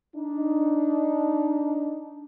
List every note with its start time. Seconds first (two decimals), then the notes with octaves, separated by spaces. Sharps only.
0.15 D4 D#4